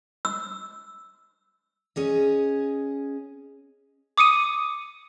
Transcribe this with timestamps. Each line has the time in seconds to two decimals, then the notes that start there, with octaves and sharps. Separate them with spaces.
0.25 E6
1.96 C#4 G#4 D#5
4.18 D6 D#6 C#7 D#7